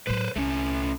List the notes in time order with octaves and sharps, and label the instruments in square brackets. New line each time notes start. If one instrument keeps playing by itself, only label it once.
[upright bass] A2 F#3 [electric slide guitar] B4 C5
[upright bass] C2 [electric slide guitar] A3 C#4